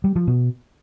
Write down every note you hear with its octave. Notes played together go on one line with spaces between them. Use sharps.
G3
F3
B2